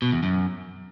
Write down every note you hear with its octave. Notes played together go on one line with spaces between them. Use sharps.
B2
E2
F#2